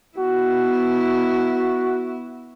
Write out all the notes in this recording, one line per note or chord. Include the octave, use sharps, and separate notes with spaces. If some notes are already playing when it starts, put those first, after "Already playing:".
B3 E4 F#4